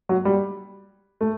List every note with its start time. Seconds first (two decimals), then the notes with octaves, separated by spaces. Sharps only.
0.09 F#3
0.25 G3
1.21 A3